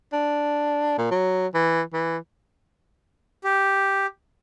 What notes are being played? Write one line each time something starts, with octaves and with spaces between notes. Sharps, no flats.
D4
A#2
F#3
E3
E3
G4